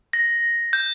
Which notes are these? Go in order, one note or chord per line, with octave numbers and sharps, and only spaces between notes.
A#6
G6